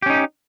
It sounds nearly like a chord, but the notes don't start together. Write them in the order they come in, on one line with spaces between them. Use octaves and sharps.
G4 C#4 D#4